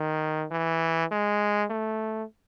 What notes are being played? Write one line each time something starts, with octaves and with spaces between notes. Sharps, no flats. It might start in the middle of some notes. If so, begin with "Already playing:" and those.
Already playing: D#3
E3
G#3
A3